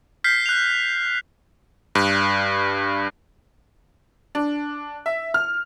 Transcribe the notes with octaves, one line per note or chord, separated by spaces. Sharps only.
F6 G6 B6 C7
F#6 F7
G2
D4
E5
F6